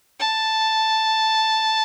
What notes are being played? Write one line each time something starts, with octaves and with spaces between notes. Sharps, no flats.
A5